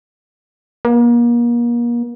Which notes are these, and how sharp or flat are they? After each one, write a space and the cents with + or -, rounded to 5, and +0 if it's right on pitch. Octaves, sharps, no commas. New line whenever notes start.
A#3 +35